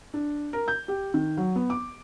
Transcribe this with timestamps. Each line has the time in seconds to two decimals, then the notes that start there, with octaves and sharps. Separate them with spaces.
0.14 D4
0.53 A#4
0.68 G6
0.88 G4
1.14 D#3
1.37 F#3
1.56 B3
1.70 D6